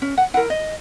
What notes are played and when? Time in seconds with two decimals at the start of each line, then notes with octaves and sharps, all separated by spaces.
0.02 C#4
0.18 F#5
0.34 E4 F#5
0.37 A#4
0.50 D#5